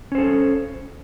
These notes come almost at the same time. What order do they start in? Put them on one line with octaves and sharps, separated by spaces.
C#4 C5 A4